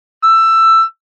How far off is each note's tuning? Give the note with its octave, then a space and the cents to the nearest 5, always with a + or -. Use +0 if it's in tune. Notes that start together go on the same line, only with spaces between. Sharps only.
E6 +15